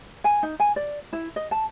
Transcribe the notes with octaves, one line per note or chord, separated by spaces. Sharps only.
G#5
D#4
G#5
D5
E4
D#5
A5